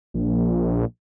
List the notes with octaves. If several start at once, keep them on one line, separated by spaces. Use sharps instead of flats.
A#1